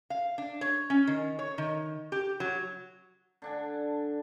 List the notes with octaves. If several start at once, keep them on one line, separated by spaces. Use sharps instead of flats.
F5
D4
C#5
C#4
D#3
C#5
D#3
G4
F#3
D3 D4 G#5